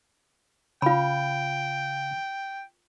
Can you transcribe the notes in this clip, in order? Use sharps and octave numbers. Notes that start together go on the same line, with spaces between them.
C#3 F4 F5 G5 B5